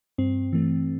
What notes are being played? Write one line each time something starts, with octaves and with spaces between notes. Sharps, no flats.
G2 C4
E3 A3